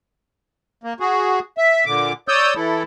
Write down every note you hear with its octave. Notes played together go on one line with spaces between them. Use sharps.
A#3
F#4 G#4
E5
A#2 D3 D6
C#5 D5 D#6 E6 G6
E3 E4 A4